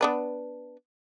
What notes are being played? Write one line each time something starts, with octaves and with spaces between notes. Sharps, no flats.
B3 D4 B4